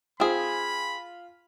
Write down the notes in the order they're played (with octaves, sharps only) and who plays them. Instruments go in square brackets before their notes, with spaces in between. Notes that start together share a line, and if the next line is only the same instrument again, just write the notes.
[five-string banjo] C4 G#4 [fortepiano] F4 [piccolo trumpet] B5